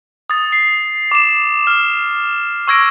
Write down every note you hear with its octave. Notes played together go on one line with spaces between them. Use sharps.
D#6 A6
C7
D6 E7
F6
C#6 E6 G#6 A#6 D7